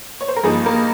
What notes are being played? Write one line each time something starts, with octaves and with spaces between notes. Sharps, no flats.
C#5
C5
A#4
G2 F3 A#3 D#4 G#4
A#3 A#4